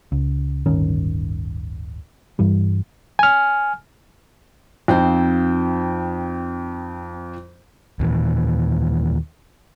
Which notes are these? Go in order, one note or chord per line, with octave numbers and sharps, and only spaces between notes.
C#2
D1 G1 D#3 C#4
G2 E3 G3
G#5 F6
F2 C4 D#4 F5 G5
D#2 A#2 E3